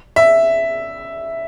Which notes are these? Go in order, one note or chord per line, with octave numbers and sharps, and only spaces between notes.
E5